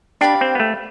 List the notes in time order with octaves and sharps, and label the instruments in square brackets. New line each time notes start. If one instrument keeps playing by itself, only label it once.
[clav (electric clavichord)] D4 [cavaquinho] G4 D5 F5 B5
[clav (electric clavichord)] C4
B3
A3